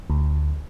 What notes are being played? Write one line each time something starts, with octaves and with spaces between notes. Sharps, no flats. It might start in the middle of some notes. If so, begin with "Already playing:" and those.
D2